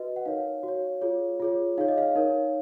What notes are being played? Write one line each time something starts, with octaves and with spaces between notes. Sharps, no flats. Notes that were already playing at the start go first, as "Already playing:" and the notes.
Already playing: F#4 B4 D#5
F#5
D#4 A#4 C#5 F5
F#4
C#5
F4 G#4 C#5
F4 G#4 C#5
D#4 G#4 C#5 F5
D#5
F5
D#4 A#4 C#5